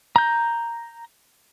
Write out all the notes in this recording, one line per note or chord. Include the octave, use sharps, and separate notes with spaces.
A#5 G6